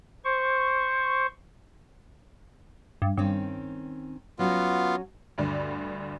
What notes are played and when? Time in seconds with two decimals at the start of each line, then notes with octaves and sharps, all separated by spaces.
0.24 C5 C#6
3.02 G2
3.17 G2 D#3 C4 C#4
4.39 F#3 B3 C#4 F4 F#4
5.38 D2 G2 D3 D5